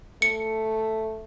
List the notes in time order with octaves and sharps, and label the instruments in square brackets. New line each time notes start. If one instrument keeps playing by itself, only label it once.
[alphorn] A3 [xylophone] C#7